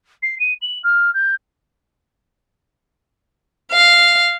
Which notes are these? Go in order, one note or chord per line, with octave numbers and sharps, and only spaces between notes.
C7
D#7
F#7
F6
G6
F5